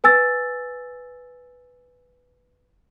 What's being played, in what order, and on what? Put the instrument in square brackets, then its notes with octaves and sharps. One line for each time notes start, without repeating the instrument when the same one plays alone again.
[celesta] B4 G#5 E6 A6